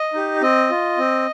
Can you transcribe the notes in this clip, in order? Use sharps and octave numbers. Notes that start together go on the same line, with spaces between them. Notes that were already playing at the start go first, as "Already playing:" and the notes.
Already playing: D#5
D#4 G4
C4 D#5
F4
C4